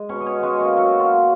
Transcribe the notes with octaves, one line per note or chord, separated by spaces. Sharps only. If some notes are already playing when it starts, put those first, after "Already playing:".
Already playing: G#3 G#4
B2 C#4 C#5
D#5
C#4 C#5
G#3 C#4 F#4 G#4
A#3 A#4
F#3 F#4
F4